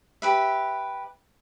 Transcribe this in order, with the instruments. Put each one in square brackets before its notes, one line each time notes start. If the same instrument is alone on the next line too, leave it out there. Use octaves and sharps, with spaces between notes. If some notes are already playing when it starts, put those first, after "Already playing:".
[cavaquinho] G4 B4 E5